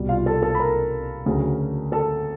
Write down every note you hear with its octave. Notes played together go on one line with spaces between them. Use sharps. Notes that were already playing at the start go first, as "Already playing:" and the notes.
Already playing: C2 B2 G3
F4 F5
A4 A5
A4 A5
B5
A#4 A#5
D2 C#3 F#3
A4 A5